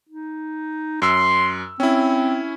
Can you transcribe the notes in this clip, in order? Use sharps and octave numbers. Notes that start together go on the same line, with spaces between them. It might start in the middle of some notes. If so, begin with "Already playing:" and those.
D#4
F#2 C6 E6
C4 C#4 E4